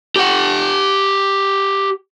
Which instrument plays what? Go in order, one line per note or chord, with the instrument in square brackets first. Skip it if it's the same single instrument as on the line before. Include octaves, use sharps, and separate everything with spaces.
[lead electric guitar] G4 F#5